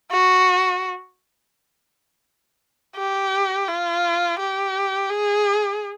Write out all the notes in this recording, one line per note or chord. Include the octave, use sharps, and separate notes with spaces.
F#4
G4
F4
G4
G#4